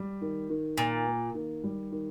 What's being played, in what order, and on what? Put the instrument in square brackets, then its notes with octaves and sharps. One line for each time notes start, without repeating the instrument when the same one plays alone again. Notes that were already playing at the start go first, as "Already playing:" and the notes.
Already playing: [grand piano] G3
D#3
D#3
[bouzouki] A#2 [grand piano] A#3
[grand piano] A#3
D#3
G3
D#3